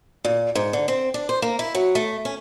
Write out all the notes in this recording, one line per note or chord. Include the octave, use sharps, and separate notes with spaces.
A#2
G#2
D3
C4
D4
C5
A#3
E4
F#3
A3
C#4